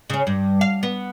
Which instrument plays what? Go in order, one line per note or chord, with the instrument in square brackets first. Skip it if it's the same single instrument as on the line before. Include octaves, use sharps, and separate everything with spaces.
[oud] C#3 C#4
G2
F5
B3